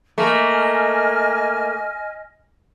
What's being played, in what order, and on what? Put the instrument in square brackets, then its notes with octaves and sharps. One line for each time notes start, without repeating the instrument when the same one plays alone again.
[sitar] A3 A#3 [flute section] D#5 G#5 F6